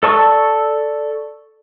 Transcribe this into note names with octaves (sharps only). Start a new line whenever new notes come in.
A4 D5 A5 C#6 E6